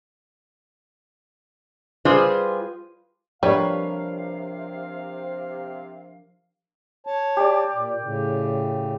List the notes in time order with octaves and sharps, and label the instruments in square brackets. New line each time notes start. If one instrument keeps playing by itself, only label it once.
[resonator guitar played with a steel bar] G3 F4 G#4 B4 C5
[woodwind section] C3 F5 [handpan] F3 D4 A#4 [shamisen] G3 [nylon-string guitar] B4 C#5
[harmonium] C#5 A5
[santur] G4 D5
[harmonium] A#2
A2 C#3